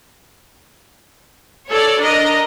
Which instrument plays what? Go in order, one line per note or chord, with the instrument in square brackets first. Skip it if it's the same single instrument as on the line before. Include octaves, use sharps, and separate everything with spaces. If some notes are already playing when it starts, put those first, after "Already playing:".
[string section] A4 C#5 D5
D4 A#4 D#5